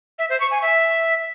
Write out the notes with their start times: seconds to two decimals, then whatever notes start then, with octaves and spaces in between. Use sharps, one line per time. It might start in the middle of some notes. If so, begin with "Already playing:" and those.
0.19 E5
0.29 C5
0.40 C#6
0.51 G#5
0.62 E5